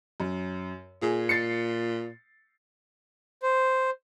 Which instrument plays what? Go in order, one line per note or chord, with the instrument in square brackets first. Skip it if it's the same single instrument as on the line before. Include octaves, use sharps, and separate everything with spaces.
[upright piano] F#2
[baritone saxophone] A#2 [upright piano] G#4
[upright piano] A6 C7 C#7
[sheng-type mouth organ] C5